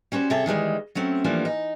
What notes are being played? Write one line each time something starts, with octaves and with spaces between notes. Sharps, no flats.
G3 C#4 F#4 C5
C3 G#4 A4 C#5 E5
D#3 E3 G3 G#3
F#3 A3 C4 C#4
E3 F3 G3 A3 A#3 D4
D#4